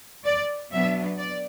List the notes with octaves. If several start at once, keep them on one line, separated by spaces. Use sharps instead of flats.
D5
B2 F#3 B3 D4 E5
D5